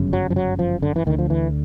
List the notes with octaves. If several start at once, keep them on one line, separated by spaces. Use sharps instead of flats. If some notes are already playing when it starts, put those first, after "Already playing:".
Already playing: G1 F#2 C#3
F#3
F3
F#3
F3
D3
E3
D2 D3 D#3
F3
E3